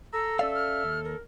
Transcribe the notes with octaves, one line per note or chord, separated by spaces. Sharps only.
A4 A#5 E6
C#4 D5 E5 F5
F6
D#2
A#4